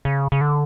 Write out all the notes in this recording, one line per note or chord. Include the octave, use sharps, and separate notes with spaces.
C#3
C#3
D3